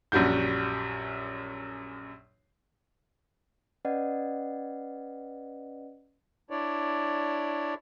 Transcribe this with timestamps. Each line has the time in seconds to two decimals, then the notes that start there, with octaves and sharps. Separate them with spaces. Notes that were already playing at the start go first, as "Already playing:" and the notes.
0.12 A#1 F#2 G3 F#4 G6
3.85 C#4 B4 D5 D#5 F#5
6.51 D4 E4 C#5 D5